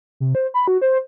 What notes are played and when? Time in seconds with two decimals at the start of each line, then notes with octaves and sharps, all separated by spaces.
0.20 C3
0.35 C5
0.54 B5
0.68 F#4
0.81 C5